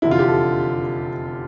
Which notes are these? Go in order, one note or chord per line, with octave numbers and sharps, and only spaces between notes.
F1 E2 D3 E4
F4
G4
A4